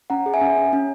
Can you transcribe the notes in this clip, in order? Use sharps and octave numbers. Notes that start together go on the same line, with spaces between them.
C#4 F#5 A#5
G#4
E5 G#5
C#4
C#4
C#4